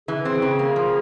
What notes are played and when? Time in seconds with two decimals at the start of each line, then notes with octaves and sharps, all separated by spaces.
0.08 E3 G#4
0.25 C4
0.42 C#3
0.59 A#3
0.76 F3